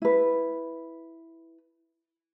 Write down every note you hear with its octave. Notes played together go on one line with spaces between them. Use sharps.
E4 B4